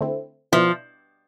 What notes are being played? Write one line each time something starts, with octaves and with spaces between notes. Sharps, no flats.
D3 A3 C4 E4
B2 F3 B3 E4